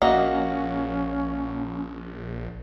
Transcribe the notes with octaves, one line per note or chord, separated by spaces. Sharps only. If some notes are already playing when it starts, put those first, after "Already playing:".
A#1 A#3 C#4 F#4 D#5 E5